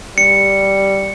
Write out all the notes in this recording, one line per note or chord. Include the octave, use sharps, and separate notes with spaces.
G3 C#7